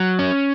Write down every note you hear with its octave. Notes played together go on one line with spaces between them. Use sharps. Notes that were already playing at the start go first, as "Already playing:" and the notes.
Already playing: F#3
C#4